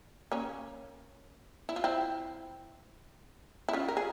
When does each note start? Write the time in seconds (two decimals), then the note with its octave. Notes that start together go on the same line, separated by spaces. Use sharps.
0.32 A#3 C#4
1.69 E4
1.76 F4
1.84 C4 E4
3.69 E4
3.73 C#4 F4
3.88 A#4
3.97 G#4